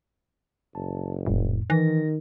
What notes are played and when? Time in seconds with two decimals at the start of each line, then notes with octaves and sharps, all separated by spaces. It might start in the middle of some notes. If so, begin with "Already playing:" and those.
0.75 F#1 A5
1.26 D#1 F2 A2
1.70 D#3 E3 A#6